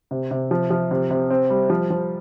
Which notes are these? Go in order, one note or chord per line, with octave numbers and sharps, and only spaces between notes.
C3
C3
F3
F3
C3
C3
C4
G3
F3
F3